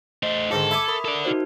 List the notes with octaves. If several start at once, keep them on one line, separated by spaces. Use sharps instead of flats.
A3 C5 D#5
G#2 D3 D#3 A4
E5 G#5 B5 D6
A#4 B5 D#6
A4 A#4 D5
D#4 F#4 C5